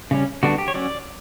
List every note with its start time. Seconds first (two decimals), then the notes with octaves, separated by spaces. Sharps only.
0.11 C#3 G3 C#4
0.43 D3 G3 B3 D4 F#4
0.58 G4
0.68 C#5
0.74 F#3 C#4 D5